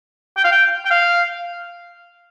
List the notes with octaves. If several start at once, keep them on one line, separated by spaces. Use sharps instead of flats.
G5
F5
G5
G5
F5